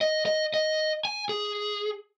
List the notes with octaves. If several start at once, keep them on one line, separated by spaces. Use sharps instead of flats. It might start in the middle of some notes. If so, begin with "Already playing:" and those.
D#5
D#5
D#5
G#5
G#4